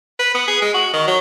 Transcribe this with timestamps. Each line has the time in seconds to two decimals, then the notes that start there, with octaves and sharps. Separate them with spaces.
0.19 B4
0.35 B3
0.48 G#4
0.62 G#3
0.74 F#4
0.93 D#3
1.07 F#3